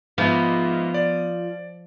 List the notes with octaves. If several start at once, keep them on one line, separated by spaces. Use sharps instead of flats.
G#2 F3 B3 E5
D5